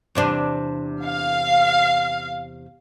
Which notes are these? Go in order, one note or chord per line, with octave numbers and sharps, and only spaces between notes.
E2 C3 D4
F5